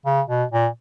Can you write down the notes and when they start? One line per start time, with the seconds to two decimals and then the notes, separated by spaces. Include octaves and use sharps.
0.05 C#3
0.28 B2
0.52 A#2